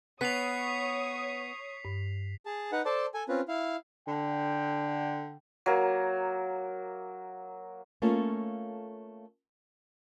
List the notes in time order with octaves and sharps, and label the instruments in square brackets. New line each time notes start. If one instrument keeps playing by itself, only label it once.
[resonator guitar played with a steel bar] B3 B4 [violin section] C#5 C#6 D#6 [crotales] B6 C7 F7
[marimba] G2
[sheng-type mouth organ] G#4 A5
D#4 B4 F#5
A4 C5 D5 A5
A4 G#5
C4 C#4 F4 B4
E4 F5
[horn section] D3 G5
[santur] F#3 A#3
[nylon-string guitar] A3 A#3 C#4 F4 A4